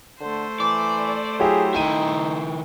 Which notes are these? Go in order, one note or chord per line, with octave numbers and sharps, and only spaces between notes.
D3 A3 C5
E3 D5
F#3 E4 G4 G#4
D#3 D#4 E4 G5 D#7